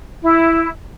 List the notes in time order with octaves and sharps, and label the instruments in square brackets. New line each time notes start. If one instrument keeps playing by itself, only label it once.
[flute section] E4